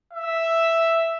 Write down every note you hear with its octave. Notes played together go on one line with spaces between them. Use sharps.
E5